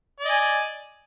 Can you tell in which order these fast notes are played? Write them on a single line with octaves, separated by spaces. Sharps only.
D5 D#5 G#5